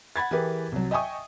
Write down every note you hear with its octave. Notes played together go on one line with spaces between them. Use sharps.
F#5 B5 G#6 A6
E3 E4 G4 G#4 A#4 B4
C2 F#3
D#5 E5 G5 G#5 C#6 D#6